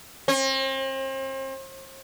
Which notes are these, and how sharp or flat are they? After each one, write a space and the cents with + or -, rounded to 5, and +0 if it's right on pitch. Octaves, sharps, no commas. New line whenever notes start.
C4 +40